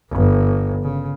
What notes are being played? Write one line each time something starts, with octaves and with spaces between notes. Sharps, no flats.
G1
C#3